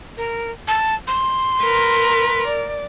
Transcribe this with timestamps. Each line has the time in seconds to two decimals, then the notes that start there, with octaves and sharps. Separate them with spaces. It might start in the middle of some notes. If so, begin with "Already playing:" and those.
0.17 A#4
0.68 A5
1.08 C6
1.62 A#4 B4
2.48 D5